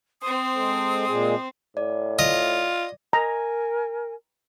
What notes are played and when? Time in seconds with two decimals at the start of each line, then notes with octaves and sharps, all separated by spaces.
0.22 C4 C5 D#6
0.56 G#3 A4
1.08 A#2 G#3 G#4
1.77 A2 D5
2.19 F4 D#5
3.13 A#4 G#5 A#5